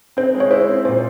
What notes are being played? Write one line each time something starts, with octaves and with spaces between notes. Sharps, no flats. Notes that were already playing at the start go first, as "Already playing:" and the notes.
C4 C5
G#3
C#5
E4 C5
C4
A#2 C5